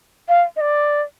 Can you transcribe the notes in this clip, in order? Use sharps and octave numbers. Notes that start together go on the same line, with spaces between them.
F5
D#5
D5